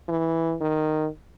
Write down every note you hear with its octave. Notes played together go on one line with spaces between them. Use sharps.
E3
D#3